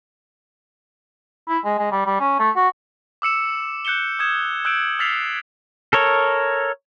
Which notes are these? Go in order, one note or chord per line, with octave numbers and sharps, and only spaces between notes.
E4
G#3
G#3
G3
G3
C#4
A3
F#4
D6 E6 C#7 E7
F#6 G6 C#7 E7 G7
D#6 G6 G#6 E7
E6 F#6 G6 D7 E7 F#7
E6 F6 A6 B6 C7 F7
A4 A#4 C#5